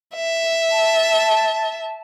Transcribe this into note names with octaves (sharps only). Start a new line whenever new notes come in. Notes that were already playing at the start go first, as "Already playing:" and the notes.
E5
A5